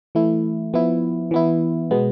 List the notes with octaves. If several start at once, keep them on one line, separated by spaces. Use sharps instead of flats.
E3 A3 E4
F3 B3 E4
E3 B3 E4
B2 G#3 B3